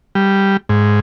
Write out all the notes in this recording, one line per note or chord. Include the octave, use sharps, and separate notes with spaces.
G3
G#2